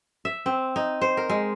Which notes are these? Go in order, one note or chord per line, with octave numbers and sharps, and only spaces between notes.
E5
C4
D#4
C5
A#4
G#3